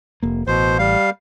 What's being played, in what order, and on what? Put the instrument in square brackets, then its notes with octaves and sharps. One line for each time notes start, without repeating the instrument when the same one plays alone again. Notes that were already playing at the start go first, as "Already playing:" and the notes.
[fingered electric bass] F1 A#3
[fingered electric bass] A1 [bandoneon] B2 C5
[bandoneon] G3 F5